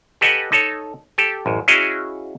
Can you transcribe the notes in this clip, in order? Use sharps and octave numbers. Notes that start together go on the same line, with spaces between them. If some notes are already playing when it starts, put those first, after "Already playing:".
G4 A4 B4 D#5 F#5 G#5
D#4 A4 C#5
G4 A4
A1 F#2
C#4 E4 F#4 G#4 D#5 F5